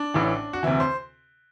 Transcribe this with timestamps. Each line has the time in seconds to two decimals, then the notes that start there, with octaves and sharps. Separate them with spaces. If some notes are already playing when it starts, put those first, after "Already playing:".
Already playing: D4
0.14 A1 A2 E3
0.53 F#4
0.63 D2 C3 E3 E4
0.80 C5